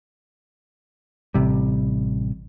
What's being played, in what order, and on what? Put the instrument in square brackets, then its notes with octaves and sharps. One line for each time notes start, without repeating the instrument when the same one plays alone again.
[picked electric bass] A1 C3 G3